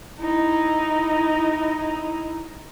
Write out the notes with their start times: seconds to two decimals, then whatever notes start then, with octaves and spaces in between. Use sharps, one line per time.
0.20 D#4 E4